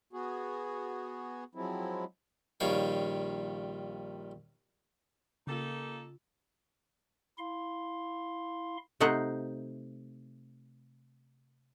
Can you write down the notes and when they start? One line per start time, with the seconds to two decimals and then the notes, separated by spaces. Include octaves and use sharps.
0.13 B3 F#4 G#4
1.55 F3 F#3 G#3 C4 E4
2.60 A#1 D#3 G3 C#5 F5 G5
5.47 C#3 A#3 D#4 F4 G4 A4
7.38 E4 F5 C6
9.00 C3 A3 D#4 C5 F#5